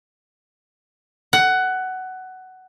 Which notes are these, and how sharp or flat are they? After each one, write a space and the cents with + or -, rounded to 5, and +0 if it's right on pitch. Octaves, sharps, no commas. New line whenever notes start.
F#5 +15